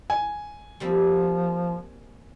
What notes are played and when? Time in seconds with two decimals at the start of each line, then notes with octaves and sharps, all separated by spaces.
0.10 G#5
0.80 F3 G3 A#3 C4